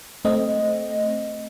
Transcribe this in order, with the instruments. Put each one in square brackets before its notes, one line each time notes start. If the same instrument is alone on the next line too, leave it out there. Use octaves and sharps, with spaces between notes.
[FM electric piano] A3 C4 D#5